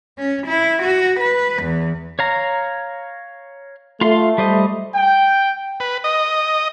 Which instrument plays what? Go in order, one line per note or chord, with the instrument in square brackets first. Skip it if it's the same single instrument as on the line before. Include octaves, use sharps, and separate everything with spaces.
[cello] C#4
E4
F#4
B4
E2
[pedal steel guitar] C#5 F5 A#5
[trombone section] A3 [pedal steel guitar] F4 F5 C6
[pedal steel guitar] G3 C5 D#5
[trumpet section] G5
[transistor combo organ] B4
D#5